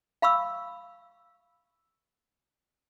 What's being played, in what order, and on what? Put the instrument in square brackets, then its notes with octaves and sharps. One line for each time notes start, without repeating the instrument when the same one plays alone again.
[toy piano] F5 B5 C#6 E6